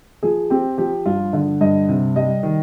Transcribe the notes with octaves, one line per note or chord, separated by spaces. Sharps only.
F3 G#4
C4 G4
F3 G4
G2 F4
D3
G2 D#5
C3
G3 D#5
D#3